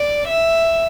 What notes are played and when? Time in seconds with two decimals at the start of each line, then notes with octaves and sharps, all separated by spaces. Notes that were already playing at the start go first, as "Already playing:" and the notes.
Already playing: D5
0.28 E5